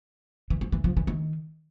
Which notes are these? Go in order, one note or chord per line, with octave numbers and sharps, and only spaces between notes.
E3
F3
E3
F3
E3
D#3